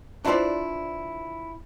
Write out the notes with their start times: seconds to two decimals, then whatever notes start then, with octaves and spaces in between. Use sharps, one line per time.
0.25 D4 E4 F4 B4 C5 D5